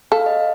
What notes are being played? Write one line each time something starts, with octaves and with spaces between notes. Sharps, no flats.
A4 F5
D#5